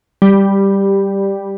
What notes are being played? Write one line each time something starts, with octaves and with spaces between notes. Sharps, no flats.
G3